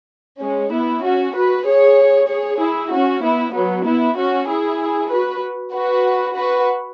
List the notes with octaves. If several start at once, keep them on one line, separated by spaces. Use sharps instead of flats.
G#3 C#4
B3 E4
C#4 F#4
F#4 B4
G#4 C#5
G#4 C#5
E4 G#4
C#4 F#4
B3 E4
F#3 B3
B3 E4
C#4 F#4
E4 G#4
F#4 B4
F#4 B4
F#4 B4